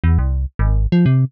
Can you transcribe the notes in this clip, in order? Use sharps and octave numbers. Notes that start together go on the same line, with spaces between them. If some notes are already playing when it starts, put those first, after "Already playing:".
E2
C2
G#1
F3
C3